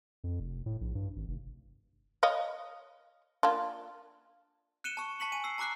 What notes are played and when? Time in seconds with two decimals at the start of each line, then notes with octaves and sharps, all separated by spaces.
0.24 F2
0.40 F1
0.66 A2
0.81 A#1
0.95 G2
1.16 G#1
1.28 F1
2.23 C#5 D#5 F5
3.43 A#3 D4 F4
4.84 F#6 C#7 D#7 E7 G7
4.97 A5 C#6
5.20 A5 C#6 B6 C#7 F#7
5.32 G#5 D#7
5.44 E6 C7
5.58 A5 A#5 D6 F#6 C7